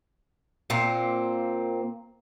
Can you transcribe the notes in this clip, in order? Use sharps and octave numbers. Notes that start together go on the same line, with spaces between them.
A#2 A#3 C4